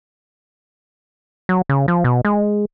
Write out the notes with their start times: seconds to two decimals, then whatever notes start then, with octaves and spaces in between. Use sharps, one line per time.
1.49 F#3
1.69 C#3
1.88 F3
2.04 B2
2.25 G#3